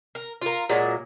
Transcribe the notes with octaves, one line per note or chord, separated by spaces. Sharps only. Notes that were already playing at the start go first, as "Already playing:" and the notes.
A#4
F4 A#4
A#2 F#3 G#3